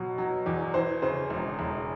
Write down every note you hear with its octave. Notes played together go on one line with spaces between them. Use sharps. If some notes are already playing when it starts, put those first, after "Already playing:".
Already playing: B2 F#3
F#3
E2
E3 C5
C#3 C5
E1
E1